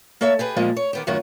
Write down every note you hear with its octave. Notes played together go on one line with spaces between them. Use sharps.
A#3 A4 C#5 E5
G4 G#4 B4
A#2 F3 G3 G#3 A#3
C#5
D#3 B3 G4
F#2 A2 D#3 F4 F#4